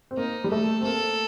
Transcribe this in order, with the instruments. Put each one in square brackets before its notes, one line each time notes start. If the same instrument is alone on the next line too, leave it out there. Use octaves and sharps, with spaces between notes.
[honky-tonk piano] C4
[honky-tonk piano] A#3 [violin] D#4
[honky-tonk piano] G3
[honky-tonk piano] A3 [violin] A4
[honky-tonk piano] C4
[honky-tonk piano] A#3 [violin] A4